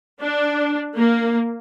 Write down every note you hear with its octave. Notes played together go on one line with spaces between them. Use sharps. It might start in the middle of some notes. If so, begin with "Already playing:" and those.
D4
A#3